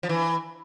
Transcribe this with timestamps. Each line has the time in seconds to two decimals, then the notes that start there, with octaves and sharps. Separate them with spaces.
0.03 F3
0.09 E3